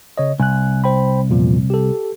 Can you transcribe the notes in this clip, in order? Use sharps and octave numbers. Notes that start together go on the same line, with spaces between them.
C#3 C#5 D#5
C2 G#5 F#6
C5 G5 B5
E2 A#2 F3
G4 A4